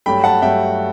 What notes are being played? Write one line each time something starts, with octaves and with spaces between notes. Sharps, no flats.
G2 F#3 A3 G5 B5
F#5 A5
G2 F#3 A3 E5 G5